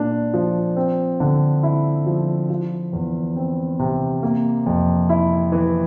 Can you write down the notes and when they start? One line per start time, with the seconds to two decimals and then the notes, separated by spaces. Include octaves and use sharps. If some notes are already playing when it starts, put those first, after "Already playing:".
Already playing: A#2 A#3 D4
0.34 F3
0.76 C4
1.20 D3
1.63 E4
2.06 F3
2.50 F3
2.93 E2
3.36 C4
3.79 C3
4.23 A#3
4.66 F2
5.09 E4
5.52 E3